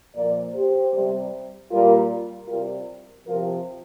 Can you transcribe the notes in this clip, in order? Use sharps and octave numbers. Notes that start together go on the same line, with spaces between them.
A#2 F3 A#4 D5
G4 C5
C3 G3
A#2 G3 F4 A#4
C3 G3 F4 A#4
C3 F3 F4 A#4